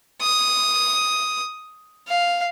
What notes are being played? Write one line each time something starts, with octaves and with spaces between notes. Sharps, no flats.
D#6
F5